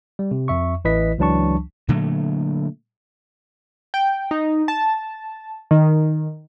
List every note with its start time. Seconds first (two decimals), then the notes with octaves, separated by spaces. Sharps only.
0.19 G3
0.31 C3
0.48 F2 E5 C#6
0.85 A1 E3 E4 B4 D#5 B6
1.18 C#2 E3 F#3 D4 A5 C#6
1.88 A#2 D3 F#3 A3
3.94 G5
4.31 D#4
4.68 A5
5.71 D#3